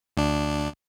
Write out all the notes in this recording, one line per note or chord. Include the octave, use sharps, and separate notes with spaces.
D2 D4